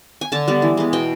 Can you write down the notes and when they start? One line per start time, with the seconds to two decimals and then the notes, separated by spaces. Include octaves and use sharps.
0.21 G#5
0.32 D3 A5
0.48 G3 B3
0.62 E3
0.77 G#3 B3
0.93 B2 G5